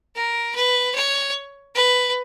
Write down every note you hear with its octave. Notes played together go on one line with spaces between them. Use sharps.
A#4
B4
C#5
B4